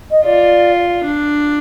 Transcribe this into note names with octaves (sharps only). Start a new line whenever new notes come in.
D#5
F4 D5
D4